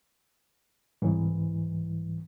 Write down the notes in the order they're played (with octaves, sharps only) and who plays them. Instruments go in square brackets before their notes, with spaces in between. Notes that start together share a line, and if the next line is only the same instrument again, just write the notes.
[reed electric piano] C2 G#2 E3